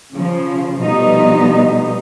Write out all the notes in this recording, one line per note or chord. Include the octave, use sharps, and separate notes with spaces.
C#3 F3
B2 F3 G3 A3 B3 D#4